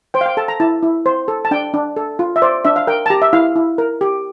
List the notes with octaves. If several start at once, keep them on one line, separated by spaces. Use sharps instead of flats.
C5 G5
F5
G5
A4 A5
A#5
E4 A5
E4
C5
A4
A5
D4 G5
D4
A4
F4
E5
C5 D5
D4 E5
F5
A#4 G5
A5
G4 A#5
E5
E4 F5
E4
A#4
G4